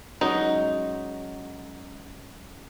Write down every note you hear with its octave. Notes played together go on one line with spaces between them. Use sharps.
F#3 G#3 C#4 D#4